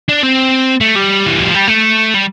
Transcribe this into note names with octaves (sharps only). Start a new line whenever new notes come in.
D4
C4
A3
G3
E3
F3
G3
A3
G3